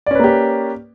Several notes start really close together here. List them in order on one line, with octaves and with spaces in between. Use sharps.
D5 C#4 B4 A#3 G4